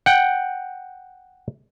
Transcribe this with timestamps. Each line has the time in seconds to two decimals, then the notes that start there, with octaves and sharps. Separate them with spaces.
0.06 F#5 G5